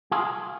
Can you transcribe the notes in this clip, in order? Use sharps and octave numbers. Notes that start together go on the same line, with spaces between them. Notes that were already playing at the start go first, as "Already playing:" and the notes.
F4 G#4